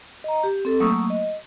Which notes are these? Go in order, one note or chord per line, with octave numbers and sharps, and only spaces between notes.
D#5 A#5
G4
C4 A4
F#3 A3 A#3 C#6 D#6 E6
D#5